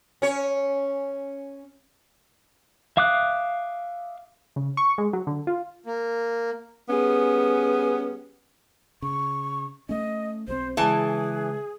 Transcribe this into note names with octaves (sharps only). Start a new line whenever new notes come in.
C#4 C#5
E5 F5 D6 D#6 F#6
C#3
C#6
G#3
F#3
D3
F4
A#3
G3 B3 C#4 G#4
C#3 C#6
A3 C#4 D#5
B1 F#3 C4 C5
C#3 E3 G#3 G#4 A5